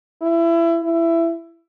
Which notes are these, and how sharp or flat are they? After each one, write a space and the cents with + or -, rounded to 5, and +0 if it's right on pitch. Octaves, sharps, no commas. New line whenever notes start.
E4 +25
E4 +20